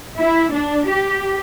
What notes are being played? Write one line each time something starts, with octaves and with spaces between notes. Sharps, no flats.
E4
D4
G4